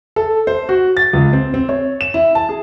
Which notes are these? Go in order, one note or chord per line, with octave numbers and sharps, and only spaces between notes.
A4
C5
F#4
A6
C#2
C4
C4
C#5
E7
E4
A5
G#4